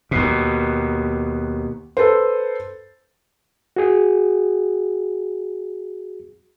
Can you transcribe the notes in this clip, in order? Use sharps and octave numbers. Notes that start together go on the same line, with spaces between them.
D#2 B2
A4 B4 C5
F#4 G#4